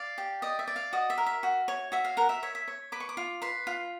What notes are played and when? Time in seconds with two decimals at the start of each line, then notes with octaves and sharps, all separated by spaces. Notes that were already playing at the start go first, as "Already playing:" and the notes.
Already playing: D5 F5
0.18 G4
0.42 D5 D#5
0.59 E5
0.67 D5
0.76 F5
0.93 F#4 D#5
1.10 E5
1.18 A#4
1.26 E5
1.43 F#4
1.68 C#5
1.92 F#4 E5
2.05 F5
2.17 A#4 F#5
2.29 E5
2.43 C#5 E5
2.55 E5
2.68 C#5
2.92 B4 D6
3.00 C#6
3.09 D6
3.17 F4
3.42 B4 C6
3.67 F4